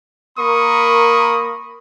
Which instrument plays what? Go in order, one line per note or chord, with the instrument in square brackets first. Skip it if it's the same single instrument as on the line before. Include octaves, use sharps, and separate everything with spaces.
[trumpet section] A#3 A#4 B5 C#6 D#6